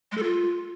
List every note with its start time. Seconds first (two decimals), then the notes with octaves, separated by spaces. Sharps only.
0.12 G#3
0.17 A4
0.23 F4